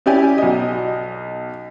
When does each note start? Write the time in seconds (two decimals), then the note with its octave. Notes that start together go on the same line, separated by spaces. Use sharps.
0.06 C#4 E4 G4 D5 G#5
0.38 B1 D#5